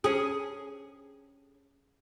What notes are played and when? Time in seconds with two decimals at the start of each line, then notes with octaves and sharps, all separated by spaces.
0.04 C#4 G#4